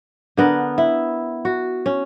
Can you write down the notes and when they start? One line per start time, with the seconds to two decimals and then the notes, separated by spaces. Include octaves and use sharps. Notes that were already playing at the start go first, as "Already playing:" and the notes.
0.37 D3 B3 A#4
0.78 E4
1.45 F#4
1.86 C#4